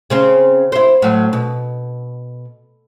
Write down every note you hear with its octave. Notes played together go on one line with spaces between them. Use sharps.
C#3 C4 C#4
E4 C5
A2 F#3
B2